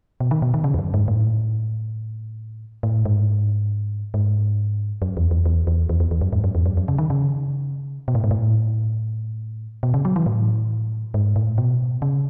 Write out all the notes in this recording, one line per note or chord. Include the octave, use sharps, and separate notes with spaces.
B2
D#3
B2
D#3
C#3
E2
F#2
G#2
A2
A2
G#2
G#2
F#2
E2
E2
E2
E2
E2
E2
E2
F#2
G#2
F#2
E2
F#2
F#2
C#3
D#3
C#3
B2
A2
G#2
A2
B2
C#3
F#3
E3
A2
G#2
A2
B2
C#3